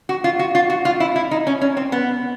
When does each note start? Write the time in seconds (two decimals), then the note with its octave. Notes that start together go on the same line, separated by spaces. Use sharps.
0.09 F#4
0.24 F4
0.39 F#4
0.55 F4
0.70 F#4
0.85 F4
1.00 E4
1.16 E4
1.31 D#4
1.47 C#4
1.61 C#4
1.77 C4
1.92 B3